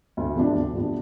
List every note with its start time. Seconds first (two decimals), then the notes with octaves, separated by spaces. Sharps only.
0.17 D2
0.36 C3 F3 B3 D4
0.55 D2
0.74 C3 F3 B3 D4